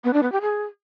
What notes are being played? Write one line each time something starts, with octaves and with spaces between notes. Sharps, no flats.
B3
D4
B3
G4
G#4